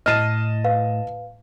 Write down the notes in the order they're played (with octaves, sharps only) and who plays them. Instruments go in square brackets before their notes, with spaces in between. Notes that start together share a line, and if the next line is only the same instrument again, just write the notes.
[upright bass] A2 [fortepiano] D#5 A5 [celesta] F6 C7 D#7
[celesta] B4 F5